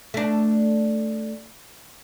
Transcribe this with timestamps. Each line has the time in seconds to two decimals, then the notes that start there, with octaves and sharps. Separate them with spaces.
0.14 A3 D4